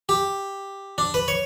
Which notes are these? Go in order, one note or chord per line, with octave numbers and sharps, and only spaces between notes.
G4
D4
B4
C#5